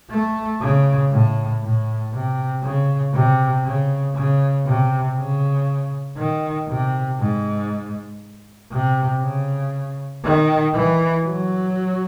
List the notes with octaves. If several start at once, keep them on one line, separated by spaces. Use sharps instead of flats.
A3
C#3
A2
A2
C3
C#3
C3
C#3
C#3
C3
C#3
D#3
C3
G#2
C3
C#3
D#3
E3
F#3